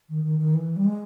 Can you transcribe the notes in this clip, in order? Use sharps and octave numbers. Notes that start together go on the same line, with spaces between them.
D#3
D#3
D#3
E3
G3
G#3